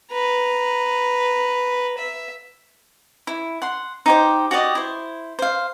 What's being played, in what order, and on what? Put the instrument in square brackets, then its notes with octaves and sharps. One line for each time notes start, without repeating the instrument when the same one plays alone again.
[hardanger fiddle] B4 A#5
E5
[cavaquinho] E4
F#5 C6
D#4 G4 C5
F#4 G4 D5 D#5
E4 C5
C5 F5